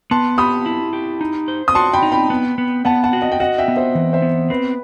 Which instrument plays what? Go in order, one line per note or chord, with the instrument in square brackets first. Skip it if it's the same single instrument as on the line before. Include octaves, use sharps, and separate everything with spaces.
[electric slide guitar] B3 [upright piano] A5 C6
[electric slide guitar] G4 [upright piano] B5 D#6
[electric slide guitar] E4
G4
D#4
C5
[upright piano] D#6
[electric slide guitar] F#4 [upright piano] A5 C6
[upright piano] G5 B5
[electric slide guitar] D#4
[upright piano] G5 B5
[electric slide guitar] B3
B3
[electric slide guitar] B3 [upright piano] F#5 A5
[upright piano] F#5 A5
[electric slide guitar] F#4
[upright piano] D#5 F#5
G5
[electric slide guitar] F#4 [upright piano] D#5 F#5
[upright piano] E5 G5
[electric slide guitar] B3
[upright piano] C5 E5
[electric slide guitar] E3
[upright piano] C5 E5
[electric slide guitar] B3
[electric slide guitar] C4 [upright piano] B4